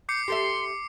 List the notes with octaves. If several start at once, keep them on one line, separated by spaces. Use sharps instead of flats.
D6 G6 C7 C#7
G4 A4 E5 C6